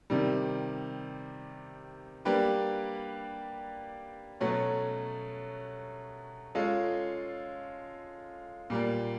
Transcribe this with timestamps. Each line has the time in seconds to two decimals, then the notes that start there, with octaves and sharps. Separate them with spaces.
0.10 C3 D#3 G3
2.25 G3 A#3 D4 G4 B4
4.40 B2 F#3 A3 C#4
6.55 G#3 C#4 F4 A4
8.70 A#2 G3 A#3